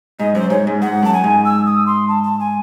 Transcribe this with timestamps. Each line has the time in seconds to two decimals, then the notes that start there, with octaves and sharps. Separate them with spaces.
0.19 G#2 D#5
0.35 F#2 C5
0.50 G#2 C#5
0.67 G#2
0.82 G#2 F#5
1.03 F#2 A5
1.14 G#5
1.24 G#2
1.45 E6
1.66 D#6
1.87 C6
2.08 A5
2.23 A5
2.40 G#5